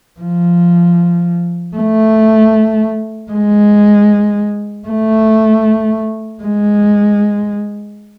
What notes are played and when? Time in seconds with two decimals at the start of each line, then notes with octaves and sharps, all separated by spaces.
0.21 F3
1.77 A3
3.32 G#3
4.89 A3
6.43 G#3